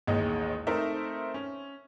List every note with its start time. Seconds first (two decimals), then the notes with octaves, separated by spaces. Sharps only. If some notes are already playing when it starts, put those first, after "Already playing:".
0.07 A1 D#2 G#3 D#5
0.67 A3 C4 D#4 A#4 C5 E5
1.34 C#4